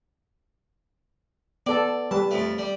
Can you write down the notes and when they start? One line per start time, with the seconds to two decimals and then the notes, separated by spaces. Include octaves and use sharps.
1.66 B3 A4 D5
2.11 G3 B4 A5
2.31 F2 A3
2.58 G3